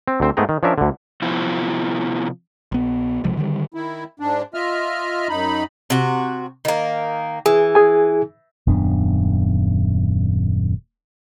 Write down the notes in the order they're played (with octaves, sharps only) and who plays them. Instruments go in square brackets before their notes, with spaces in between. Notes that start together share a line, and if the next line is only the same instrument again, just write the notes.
[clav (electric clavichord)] C4
D2 C4 C5
G#2 A3 B3 G#4 G5 A#5
D#3
F3 C#4 D4 A#4 E5
D2 D3
[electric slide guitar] C3 F3 B3 E4 F4 C5
[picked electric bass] A#1 B3
A#1 C3 F3 G#3
D3 D#3 G3
[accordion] D#3 E4
G#2 D4
F4 D#5 E5 F6
F#2 D#4 B5
[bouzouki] C3 F#4
D#3 A#3
[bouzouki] E3 [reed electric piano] G#4
[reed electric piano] G#4 G#5
[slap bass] D#1 F#2 B3 D4